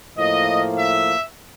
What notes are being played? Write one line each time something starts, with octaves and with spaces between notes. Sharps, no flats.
A2 F3 A#3 D#5
E5